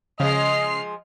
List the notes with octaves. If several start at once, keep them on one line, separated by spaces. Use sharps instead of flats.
C#3 F3 G#3 D#5 F6 C7